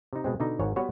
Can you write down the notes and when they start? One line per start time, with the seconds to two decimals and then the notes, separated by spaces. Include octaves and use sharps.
0.13 C3 D#4
0.24 B2 G#3 C4
0.40 B2 D3 D#4
0.59 G#1 G#2 C#5
0.76 G3 B3 F#4 B4 C#5